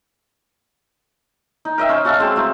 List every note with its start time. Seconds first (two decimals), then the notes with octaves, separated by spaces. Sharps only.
1.65 D#4
1.78 A#4 D#5 E5 G5
1.89 C#4 C5 D#5
2.04 C#4 F#4 A4 F5
2.19 G#3 C4 G#4 A5
2.36 F#3 A3